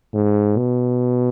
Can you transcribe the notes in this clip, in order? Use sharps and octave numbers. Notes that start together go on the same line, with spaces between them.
G#2
B2